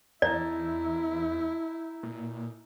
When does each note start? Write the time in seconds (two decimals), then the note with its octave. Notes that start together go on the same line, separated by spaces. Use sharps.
0.22 E2 D#4 E4 D5 A5
2.03 A#2